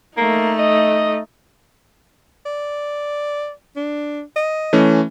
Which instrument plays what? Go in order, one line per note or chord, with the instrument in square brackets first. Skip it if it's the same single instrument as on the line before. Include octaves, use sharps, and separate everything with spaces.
[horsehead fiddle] A3 D#4 [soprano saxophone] A#3
[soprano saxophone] D#5
[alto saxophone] D5
D4
D#5
[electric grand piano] E3 A3 C#4